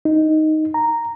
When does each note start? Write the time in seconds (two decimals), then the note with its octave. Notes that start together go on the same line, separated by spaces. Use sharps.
0.05 D#4
0.74 A#5